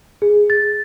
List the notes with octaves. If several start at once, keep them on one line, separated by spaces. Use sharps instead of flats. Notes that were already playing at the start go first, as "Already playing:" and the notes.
G#4
A6